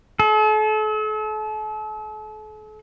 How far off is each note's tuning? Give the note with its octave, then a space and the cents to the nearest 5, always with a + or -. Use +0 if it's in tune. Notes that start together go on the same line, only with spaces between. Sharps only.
A4 -40